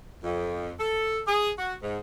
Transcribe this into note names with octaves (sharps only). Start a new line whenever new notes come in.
F2
A4
G#4
F#4
G#2